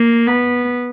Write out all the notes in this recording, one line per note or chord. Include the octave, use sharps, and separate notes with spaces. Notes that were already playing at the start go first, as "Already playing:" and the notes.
Already playing: A#3
B3